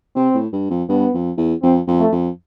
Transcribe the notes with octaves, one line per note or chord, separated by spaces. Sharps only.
C3 C4
A2
G2
F2
G2 B3
F2
E2
F2 C4
F2
A3
F2